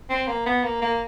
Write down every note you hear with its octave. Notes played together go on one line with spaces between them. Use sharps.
C4
A#3
B3
A#3
A#3